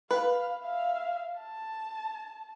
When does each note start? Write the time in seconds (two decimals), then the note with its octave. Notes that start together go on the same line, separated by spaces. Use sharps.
0.11 B4 F5
0.63 E5 F5
1.40 A5